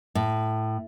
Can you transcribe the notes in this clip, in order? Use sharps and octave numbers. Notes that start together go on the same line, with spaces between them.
A2